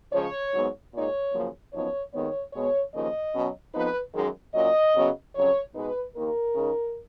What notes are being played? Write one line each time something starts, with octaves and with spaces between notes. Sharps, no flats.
C#3 F3 G#3 C#5
G#2 F#3 B3
A#2 G#3 D#4 C#5
F#2 C#3 F3 A#3
F#2 F3 B3 D#4 C#5
D#2 D#3 G#3 B3 C#5
B2 G#3 B3 C#5
D#2 C#3 F3 A#3 D#4 D#5
B2 F#3 C#4
F2 F3 B3 D#4 B4
F#2 D#3 G#3
A#2 F#3 C#4 D#5
F#2 C#3 F#3 B3
F2 C#3 F#3 C#4 C#5
B2 G#3 B3 D#4 B4
D#2 D#3 A#3 A#4
C#3 G#3 D#4